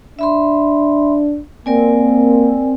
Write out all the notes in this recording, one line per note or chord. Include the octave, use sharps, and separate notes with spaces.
D4 E5 B5 C6
A#3 C4 A#4 D5 G#5